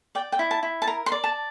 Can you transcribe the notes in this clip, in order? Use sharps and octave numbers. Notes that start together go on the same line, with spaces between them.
D5 G5
G5
E4
A5
E4
A5
A#4 A#5
C6
D5
A5